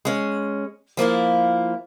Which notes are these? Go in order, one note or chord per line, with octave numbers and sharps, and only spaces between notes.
G#3 C#4
F3 A#3 E4 F4